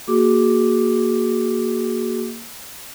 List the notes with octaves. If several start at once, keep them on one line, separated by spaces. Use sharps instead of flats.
A#3 F#4 G#4 D6